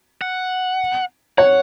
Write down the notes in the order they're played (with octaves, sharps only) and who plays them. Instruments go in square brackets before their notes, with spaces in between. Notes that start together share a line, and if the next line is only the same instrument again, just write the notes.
[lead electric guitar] F#5
[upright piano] C#5 [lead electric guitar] F#5